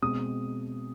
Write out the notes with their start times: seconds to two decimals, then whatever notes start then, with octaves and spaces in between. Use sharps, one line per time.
0.02 B2 G#3 C4 D#6